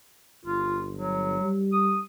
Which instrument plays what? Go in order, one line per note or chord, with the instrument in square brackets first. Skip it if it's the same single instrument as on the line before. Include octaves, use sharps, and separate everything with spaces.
[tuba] G1 [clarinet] F4
[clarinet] F#3
[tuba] G3
[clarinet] D#6